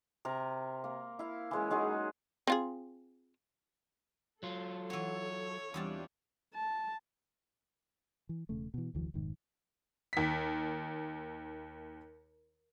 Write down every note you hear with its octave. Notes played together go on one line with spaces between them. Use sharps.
C3 A#4
A#3
E4 F5
E3 G#3 C#4
F#3 G#3 D#4 G#4
C4 F4 G#4
F#3 F4 A4
E3 F#4 C#5
E2 G3 C4 D4 F4 A5
A5
E3
E1 C#3 A3
B2 E3
F1 D2 E3 F#3
F1 G#2 D#3
D#2 B6